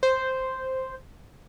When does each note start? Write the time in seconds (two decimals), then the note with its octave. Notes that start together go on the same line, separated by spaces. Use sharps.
0.03 C5